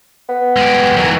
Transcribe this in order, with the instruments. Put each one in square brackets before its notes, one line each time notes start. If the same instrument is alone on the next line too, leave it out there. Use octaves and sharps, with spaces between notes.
[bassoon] B3
[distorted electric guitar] G#3 G4
[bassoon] D#3 [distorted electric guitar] E3 F#3